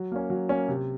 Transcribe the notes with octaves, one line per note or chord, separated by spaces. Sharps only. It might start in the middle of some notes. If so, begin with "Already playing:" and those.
Already playing: F#3
A#3 C#4
F#3
A#3 C#4
C3